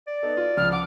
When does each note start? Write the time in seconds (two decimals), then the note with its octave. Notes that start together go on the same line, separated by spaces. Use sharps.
0.08 D5
0.23 B3 D#4 A4
0.37 F4
0.57 C#2 F3 E6 F6
0.72 F#5 D6 F6